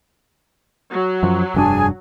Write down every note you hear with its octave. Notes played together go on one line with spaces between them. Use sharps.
F#3
F#2 F3
F1 G2 D4 G#4 G#5 A5